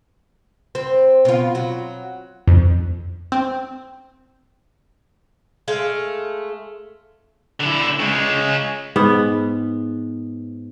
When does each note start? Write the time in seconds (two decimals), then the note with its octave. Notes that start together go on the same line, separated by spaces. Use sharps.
0.75 C4
1.25 B2 F4
1.55 F#3
2.48 F2
3.32 C4
5.68 G#3 A3 F5
7.60 D3 E4
7.99 C#3 G#3
8.96 G#2 B3